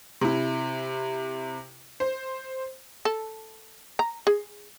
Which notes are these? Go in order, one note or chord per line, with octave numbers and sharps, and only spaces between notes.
C3 E4
C5
A4
A#5
G#4